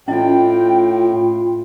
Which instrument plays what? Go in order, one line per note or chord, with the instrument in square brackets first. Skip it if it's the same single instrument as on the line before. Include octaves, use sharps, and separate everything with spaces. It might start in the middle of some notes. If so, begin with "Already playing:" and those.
[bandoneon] A2 [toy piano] C#4 E4 D#5 [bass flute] F4 [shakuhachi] G5